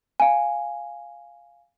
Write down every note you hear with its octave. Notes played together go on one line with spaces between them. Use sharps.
F5 G#5